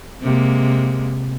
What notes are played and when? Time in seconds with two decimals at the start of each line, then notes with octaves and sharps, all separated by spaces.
0.22 C3 G#3 A#3